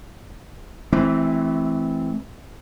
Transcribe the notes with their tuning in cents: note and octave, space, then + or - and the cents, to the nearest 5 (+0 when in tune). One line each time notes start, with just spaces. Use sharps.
E3 +0 A3 -30 C4 +5